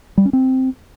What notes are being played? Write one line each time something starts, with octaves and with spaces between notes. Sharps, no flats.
G3
C#4
C4